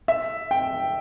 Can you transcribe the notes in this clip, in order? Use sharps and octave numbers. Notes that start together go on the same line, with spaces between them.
E5
G5